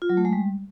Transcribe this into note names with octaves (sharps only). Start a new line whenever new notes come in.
F4
F#3
A3
G#3
G3